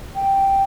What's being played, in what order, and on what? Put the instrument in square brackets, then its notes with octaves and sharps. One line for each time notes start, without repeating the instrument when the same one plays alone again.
[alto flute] G5